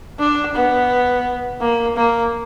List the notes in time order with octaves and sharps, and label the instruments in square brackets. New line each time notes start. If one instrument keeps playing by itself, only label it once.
[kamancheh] D4
B3
A#3
A#3